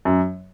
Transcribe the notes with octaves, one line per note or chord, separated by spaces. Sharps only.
F#2